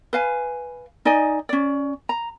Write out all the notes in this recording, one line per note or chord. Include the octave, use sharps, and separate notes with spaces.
B4 F5 G#5
D#4 D5 D#5 G#5
C#4 D5
A#5